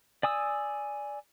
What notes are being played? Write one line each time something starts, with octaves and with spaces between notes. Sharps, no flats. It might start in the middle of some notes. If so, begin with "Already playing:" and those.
D5 G#5 D#6 E6